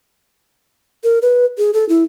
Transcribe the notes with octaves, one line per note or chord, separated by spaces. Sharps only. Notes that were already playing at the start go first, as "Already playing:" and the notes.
A#4
B4
G#4
A4
E4